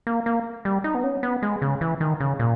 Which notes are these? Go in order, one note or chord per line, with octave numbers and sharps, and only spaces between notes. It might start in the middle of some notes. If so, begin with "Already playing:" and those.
A#3
A#3
G3
D#4
B3
C#4
B3
G#3
C#3
E3
D#3
C#3
A#2